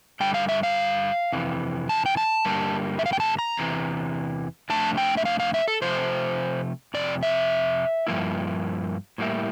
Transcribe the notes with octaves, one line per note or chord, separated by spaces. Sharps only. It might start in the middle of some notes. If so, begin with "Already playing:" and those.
G2 D3 G3 D4 G5
F5
E5
F5
F2 C3 E3
A5
G5
A5
G2 D3 G3 A#3
E5
F5
G5
A5
A#5
E2 C3 E3
F2 C3 F3 A3 D4 A5
G5
E5
F5
F5
E5
A4
C3 F3 A3 C5
F2 C3 D5
E5
G2 F3 A#3 E4
A2 G3 A#3 E4